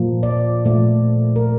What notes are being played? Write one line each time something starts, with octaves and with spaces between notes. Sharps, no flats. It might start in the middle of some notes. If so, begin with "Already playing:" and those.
Already playing: A#2 F3 A#3
D5
A#2 F3 A3
A#4